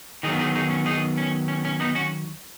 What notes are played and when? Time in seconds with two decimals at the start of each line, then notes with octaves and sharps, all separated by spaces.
0.23 D#3 F#3 B3 D#4 G#4
0.39 D#4 G#4
0.55 D#4 G#4
0.70 C#4
0.86 D#4 G#4
1.17 C#4
1.48 C#4
1.65 C#4
1.80 B3 D#4
1.95 C#4 F#4